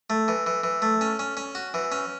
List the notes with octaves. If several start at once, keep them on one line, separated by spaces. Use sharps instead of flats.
A3
E3
E3
E3
A3
C#4
C#4
C#4
F#4
E3
C#4